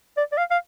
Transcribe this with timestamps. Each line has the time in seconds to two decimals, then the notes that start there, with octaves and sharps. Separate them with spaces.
0.17 D5
0.32 D5
0.38 F5
0.50 F5